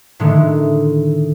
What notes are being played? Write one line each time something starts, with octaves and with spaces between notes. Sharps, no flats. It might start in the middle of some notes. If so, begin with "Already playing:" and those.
A2 D3 D#3 G#3 A3